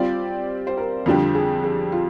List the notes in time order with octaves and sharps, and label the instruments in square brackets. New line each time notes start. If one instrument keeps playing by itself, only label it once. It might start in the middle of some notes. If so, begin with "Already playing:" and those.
Already playing: [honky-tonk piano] G3 C4 G4 D5 [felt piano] F4
[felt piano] C5
A#4
[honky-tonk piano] F2 D3 G3 D4 G4 [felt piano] F4
[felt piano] G#4
G#4
F4